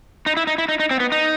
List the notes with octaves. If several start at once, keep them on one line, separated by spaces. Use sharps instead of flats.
D#4
E4
D#4
E4
D#4
D#4
C4
B3
D#4